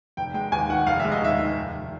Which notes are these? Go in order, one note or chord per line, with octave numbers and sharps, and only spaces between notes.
F1 G5
G#3 G5
D#2 G#5
D#3 F#5
F1 F5
G#3 E5
D#5
D#2 E5
D#3
F1
F1